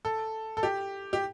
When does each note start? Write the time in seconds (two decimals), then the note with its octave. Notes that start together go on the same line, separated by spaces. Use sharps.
0.05 A4
0.57 A4
0.63 G4
1.13 G4